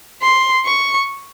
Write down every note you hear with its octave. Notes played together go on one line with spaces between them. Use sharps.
C6
C#6